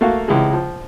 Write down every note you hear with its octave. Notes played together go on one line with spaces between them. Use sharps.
A3 A#3 F#4 F5
C#2 C3 E3 G#3
F3